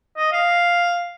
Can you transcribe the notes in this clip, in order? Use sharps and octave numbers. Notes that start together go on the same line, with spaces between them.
D#5
F5